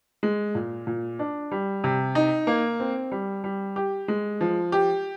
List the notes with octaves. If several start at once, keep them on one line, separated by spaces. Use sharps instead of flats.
G#3
A#2
A#2
D4
G3
C3
D#4
A#3
C4
G3
G3
G4
G#3
F3
G4